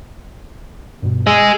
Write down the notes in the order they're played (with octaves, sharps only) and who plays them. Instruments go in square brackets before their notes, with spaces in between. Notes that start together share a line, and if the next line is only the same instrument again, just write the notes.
[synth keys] G2 B2
[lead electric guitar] G#4 D#5 [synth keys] E6